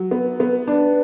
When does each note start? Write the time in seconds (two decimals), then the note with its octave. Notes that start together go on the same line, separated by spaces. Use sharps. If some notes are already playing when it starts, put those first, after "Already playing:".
Already playing: F#3
0.11 B3
0.40 B3
0.68 D4